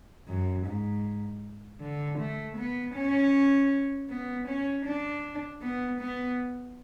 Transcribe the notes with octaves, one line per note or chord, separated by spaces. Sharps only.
F#2
G#2
D3
A3
B3
C#4
B3
C#4
D4
B3
B3